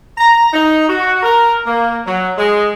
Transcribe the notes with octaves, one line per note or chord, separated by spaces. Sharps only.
A#5
D#4
F#4
A#4
A#3
F#3
G#3